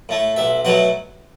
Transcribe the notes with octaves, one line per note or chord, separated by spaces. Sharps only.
A2 A3
B1 E5
B2 F#3 A3 F#5